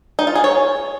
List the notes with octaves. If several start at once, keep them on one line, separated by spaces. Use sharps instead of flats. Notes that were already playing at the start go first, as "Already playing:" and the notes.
D#4
F4
G#4
C#5